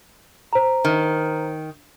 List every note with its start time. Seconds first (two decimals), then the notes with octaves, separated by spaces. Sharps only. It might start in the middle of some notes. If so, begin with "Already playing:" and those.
0.53 C5 A#5
0.85 D#3